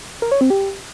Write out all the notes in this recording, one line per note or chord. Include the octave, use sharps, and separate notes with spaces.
A#4
C#5
C4
G4